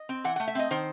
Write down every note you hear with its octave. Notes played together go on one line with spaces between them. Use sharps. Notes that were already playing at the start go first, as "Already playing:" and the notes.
Already playing: D#5
C4
E3 F#5
A3 F#5
E5
C4 D#5
D#3 C5